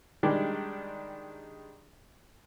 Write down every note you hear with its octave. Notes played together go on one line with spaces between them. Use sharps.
D#3 G3 G#3 D4